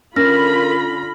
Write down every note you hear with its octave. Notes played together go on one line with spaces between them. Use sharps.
D3 C#4 F4 A#4 B5 F6 A#6